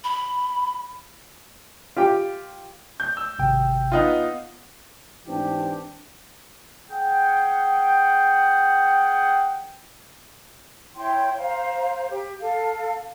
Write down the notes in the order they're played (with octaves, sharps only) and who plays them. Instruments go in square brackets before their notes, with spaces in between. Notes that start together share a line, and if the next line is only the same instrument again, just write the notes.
[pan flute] B5
[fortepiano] F4 G4 G5
[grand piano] G6
E6
[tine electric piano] G#1 C3 G5
[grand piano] B3 D#4 F4
[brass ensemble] G#2 E3 C4 D4 G4
[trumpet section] G#4 F#5 G5
[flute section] E4 C#5 G5 C6
C5 F5 A#5
G4
A4 F5